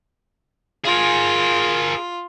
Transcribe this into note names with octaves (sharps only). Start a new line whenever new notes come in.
F4 G#4 A#4